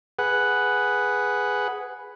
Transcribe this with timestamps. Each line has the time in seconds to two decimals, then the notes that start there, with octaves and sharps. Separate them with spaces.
0.19 G#4 B4 F#5